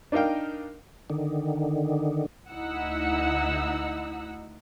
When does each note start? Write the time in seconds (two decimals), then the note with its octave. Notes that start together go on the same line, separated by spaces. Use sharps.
0.12 D4 D#4 A#4 F5 G5
1.10 D3 D#3
2.50 D2 D#4 E4 F#5 E6